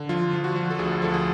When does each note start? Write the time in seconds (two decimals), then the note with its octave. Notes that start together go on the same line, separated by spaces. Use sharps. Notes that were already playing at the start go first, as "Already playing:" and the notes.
Already playing: D3
0.09 F3 F4
0.33 F3 F4
0.44 F#4
0.55 F3
0.70 A4
0.79 D2 G#4
1.02 F3 A4
1.14 G#4